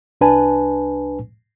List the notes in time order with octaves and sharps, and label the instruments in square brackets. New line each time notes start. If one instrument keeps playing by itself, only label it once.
[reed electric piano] C2 D4 B4 G#5 A5